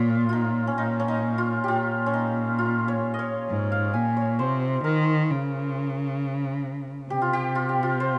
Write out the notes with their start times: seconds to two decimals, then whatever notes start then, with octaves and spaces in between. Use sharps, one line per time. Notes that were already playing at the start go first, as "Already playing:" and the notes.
Already playing: A#2 F4 C#5
0.29 D#4 F4
0.67 C#4
0.78 A#2 D#4
1.00 C#4
1.08 D#4
1.38 F4
1.64 A#2 F4 G4
2.06 C#4
2.14 D#4
2.59 F4
2.88 C#5
3.14 D#5
3.19 C#5
3.49 G#2
3.72 F5
3.94 A#2 G#5
4.17 C#5
4.39 C3 C5
4.84 D#3 A#4
5.30 C#3
7.09 C3 G4
7.22 F4
7.33 G4
7.55 F4
7.69 G4
7.83 F4
8.00 C5